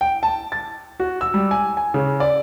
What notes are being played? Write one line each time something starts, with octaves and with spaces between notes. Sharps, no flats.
G5
A5
A6
F#4
E6
G3
G#5
G#5
C#3
D5